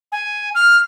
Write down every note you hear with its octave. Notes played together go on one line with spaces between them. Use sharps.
G#5
F6